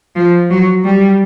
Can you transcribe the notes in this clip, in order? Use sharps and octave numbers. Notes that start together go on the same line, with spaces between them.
F3
F#3
G3